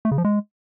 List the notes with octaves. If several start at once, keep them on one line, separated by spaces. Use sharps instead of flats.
A3
C#3
F3
G#3